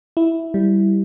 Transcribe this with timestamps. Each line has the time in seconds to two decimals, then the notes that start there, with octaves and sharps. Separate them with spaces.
0.17 E4
0.54 G3